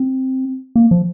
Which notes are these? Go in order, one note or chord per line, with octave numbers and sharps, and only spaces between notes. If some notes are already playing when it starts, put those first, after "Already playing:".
Already playing: C4
A#3
F3